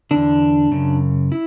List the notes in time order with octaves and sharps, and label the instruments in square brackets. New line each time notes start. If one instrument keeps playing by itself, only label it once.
[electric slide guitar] E2 D3 D4
F#2 C#3
E4